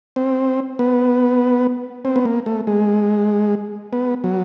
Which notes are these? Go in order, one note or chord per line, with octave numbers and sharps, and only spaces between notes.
C4
B3
C4
B3
A#3
A3
G#3
B3
F#3